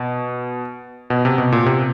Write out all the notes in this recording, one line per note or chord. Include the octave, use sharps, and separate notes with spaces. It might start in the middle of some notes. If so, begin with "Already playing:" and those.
Already playing: B2
B2
C3
B2
A#2
C3